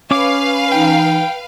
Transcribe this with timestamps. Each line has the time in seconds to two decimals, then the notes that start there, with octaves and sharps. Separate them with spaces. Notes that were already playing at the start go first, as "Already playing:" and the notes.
0.11 C#4 B4 C#5 F5 D6
0.72 E3 D#4 G5